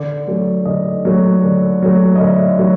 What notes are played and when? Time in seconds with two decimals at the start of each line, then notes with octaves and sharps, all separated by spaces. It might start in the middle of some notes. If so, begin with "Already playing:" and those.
Already playing: D3 D5
0.27 F#3 A3
0.65 D3 D#5
1.05 F#3 A3
1.43 D3
1.82 F#3 A3
2.16 D#5
2.20 D3 E5
2.59 F#3 A3